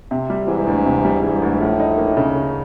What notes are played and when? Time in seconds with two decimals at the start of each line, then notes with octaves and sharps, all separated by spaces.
0.11 C3
0.30 G3
0.47 G#2 E3
0.67 D2
0.86 C3
1.05 G3
1.23 G#2 E3
1.42 D2
1.60 A2 F3
1.80 D#4
1.98 A#3
2.17 C#3